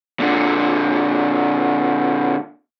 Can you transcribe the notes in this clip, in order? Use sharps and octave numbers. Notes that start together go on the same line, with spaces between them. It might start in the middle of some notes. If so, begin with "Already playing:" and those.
A#2 D3